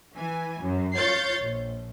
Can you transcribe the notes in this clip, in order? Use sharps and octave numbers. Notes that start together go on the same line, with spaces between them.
E3 G#5
F#2
F4 C#5 G6 A6 C7
A#1